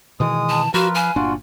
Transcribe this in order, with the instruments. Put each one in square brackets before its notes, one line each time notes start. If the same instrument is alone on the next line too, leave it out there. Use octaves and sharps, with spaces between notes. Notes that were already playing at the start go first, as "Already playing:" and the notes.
[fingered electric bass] B2 D#3 E3 [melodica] G#3 D#6
[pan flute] A5
[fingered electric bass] F3 [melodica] F4 A#4 B4 [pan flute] F#4
[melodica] B4 F5 [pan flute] G#5
[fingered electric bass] G1 A#2 D4 [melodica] F4 F#4